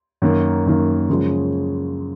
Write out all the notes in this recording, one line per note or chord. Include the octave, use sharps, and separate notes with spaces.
F#2 D#3 A#3
F#2 D#3 A#3
F#2 C#3 F3 G#3